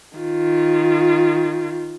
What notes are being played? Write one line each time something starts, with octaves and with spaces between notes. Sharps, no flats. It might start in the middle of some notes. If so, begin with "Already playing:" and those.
D#3 F4